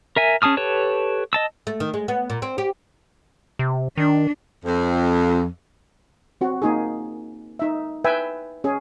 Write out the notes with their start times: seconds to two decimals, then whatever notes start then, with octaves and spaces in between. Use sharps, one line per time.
0.16 A#4 E5 G#5
0.42 C#4 G#4 A5 D#6 F6
0.57 G4 A4 B4 C#5 A5
1.33 D#5 A5 E6
1.67 A3
1.80 D#3
1.94 G#3
2.08 B3
2.30 A#2
2.42 C4
2.58 G4
3.59 C3
3.97 D#3 D4
4.64 F2
6.41 C4 F#4
6.62 A#3 D#4 G#4
7.59 D#4 E5
8.04 B4 E5 G5 G#5
8.64 C#4 G#4